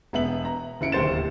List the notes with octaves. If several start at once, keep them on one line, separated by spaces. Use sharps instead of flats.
E1 B3 E5 F#7
A#5
F#1 E4 C#7 D7
D1 D#2 C3 C5 A6 E7